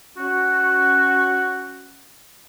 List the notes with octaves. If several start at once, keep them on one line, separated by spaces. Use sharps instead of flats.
C#4 F#4